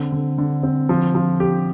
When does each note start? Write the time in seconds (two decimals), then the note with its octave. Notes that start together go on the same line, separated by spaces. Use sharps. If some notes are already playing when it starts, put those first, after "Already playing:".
Already playing: D3 C4
0.12 D3
0.38 D3
0.63 C4
0.89 F3
1.15 F3
1.40 G4